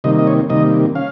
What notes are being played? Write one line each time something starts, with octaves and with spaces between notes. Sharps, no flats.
C3 D#3 G3 A#3 D#5
D#5
C#5
C3 D#3 G3 A#3 D#5
C#4 F5